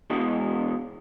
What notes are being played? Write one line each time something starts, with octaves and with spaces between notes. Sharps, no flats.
B2 E3 G#3